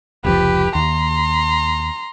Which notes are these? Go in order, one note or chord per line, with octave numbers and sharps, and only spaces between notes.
F1 C#2 F3 G4 B4
D#2 A#5 C6